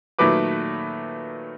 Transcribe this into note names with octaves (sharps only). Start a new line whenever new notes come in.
A#2 D#3 F#3 A3 B4 D6